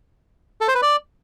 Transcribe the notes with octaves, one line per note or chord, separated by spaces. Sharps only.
A4
C5
B4
D5